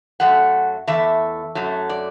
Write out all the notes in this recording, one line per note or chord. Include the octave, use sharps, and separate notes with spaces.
F#2 F#3 A3 F#5
E2 E3 A3 E5
F#2 F#3 A3
D5